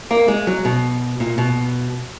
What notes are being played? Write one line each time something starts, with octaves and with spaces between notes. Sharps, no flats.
A#3
G#3
F#3
B2
A#2
B2